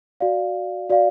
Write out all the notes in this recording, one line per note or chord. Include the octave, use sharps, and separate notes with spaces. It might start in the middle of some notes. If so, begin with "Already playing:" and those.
F#4 D5 F5
F#4 D5 F5